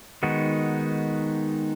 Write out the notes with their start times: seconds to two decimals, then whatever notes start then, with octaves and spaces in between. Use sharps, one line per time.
0.23 D#3 G#3 B3 D#4 F#4